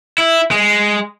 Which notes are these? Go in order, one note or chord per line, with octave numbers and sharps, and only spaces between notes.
E4
G#3